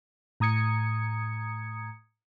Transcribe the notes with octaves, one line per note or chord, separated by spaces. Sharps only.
A2 A#5 D#6 G#6 C#7